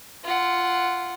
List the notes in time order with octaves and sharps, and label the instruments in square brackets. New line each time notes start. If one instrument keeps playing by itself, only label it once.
[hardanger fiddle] F4 F#5